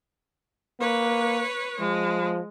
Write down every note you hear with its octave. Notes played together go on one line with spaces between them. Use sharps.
A#3 B4 C#5
F3 G#3